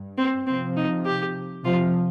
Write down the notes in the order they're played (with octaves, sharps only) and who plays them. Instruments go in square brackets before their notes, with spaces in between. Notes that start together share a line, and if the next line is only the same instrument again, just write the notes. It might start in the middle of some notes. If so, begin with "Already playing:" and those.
Already playing: [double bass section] G2
[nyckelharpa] C4
[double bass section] C3 F3 [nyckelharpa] C4
[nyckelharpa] D#4
G4
[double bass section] C3 F3 [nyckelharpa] F4